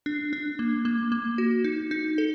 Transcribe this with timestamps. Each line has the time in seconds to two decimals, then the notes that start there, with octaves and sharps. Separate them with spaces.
0.06 D4
0.33 D4
0.59 A#3
0.85 A#3
1.12 A#3
1.38 F#4
1.64 D#4
1.91 D#4
2.18 A4